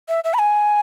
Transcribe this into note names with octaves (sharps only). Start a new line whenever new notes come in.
E5
E5
B5
G#5